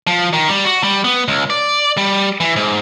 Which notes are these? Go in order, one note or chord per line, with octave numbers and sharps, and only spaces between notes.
F3
D#3
G3
F#4
G3
B3
C#2
D5
G3
E3
G#2